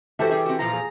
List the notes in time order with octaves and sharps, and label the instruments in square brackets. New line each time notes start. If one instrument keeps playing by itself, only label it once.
[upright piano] E3 A4 [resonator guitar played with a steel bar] F#4 C5 E5 [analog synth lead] G4
[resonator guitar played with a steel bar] G3 G#4 E5
C4 F#4
[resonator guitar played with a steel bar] A#2 F3 F4 [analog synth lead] A#5
[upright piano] G#4